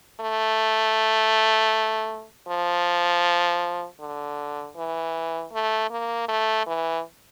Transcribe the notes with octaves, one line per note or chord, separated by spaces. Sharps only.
A3
F3
D3
E3
A3
A#3
A3
E3